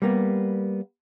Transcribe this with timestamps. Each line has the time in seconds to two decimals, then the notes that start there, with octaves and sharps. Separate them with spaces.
0.02 G3 A#3 B3